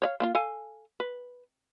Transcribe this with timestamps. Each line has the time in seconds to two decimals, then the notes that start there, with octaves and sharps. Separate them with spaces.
0.02 C#5 D5 F5
0.20 A#3 E4 F4
0.35 A4 F5 G#5
1.00 B4